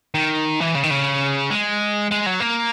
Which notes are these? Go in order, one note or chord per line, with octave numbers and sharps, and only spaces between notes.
D#3
E3
C#3
D#3
C#3
G#3
G#3
F#3
A#3